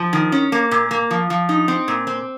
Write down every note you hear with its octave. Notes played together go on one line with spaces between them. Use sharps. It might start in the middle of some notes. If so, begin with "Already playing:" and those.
Already playing: F3
D#3
C#4
A#3
A#2
A#3
F3
F3
D#4
C4
A#2
C4